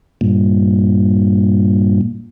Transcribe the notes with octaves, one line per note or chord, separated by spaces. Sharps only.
G2 A#2